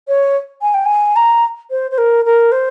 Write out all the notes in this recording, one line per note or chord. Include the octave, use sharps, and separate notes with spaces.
C#5
G#5
G5
G#5
A#5
C5
C5
A#4
A#4
C5